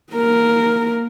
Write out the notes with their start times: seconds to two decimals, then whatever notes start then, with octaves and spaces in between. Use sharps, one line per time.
0.13 A#3 A#4